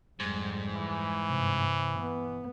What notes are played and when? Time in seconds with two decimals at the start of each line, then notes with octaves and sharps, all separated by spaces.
0.20 F2 G#2 G3
0.74 E3
1.26 G2 C3
2.00 B3